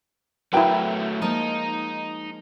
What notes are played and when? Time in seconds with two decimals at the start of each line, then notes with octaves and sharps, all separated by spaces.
0.53 F#3 A3 E4 F#4 A#4 B4 G5 A#5
1.22 F3 G#3 A#3 D#4